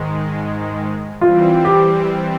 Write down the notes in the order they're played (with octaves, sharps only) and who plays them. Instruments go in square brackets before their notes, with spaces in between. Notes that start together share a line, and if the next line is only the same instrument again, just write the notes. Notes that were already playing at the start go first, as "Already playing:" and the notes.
Already playing: [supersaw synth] G#2 D#3 G#3
[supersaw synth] E3 G3 C4 [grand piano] F4
[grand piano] G4